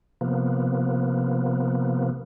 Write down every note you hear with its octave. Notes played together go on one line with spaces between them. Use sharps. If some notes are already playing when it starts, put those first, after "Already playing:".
C3 F3 A#3 B3